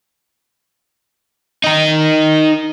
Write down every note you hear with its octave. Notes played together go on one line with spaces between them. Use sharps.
D#4 A#4